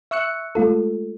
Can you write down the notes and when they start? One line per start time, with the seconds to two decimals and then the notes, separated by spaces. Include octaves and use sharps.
0.11 E5 C#6 E6 F#6 C#7
0.55 G#3 A3 F4 A4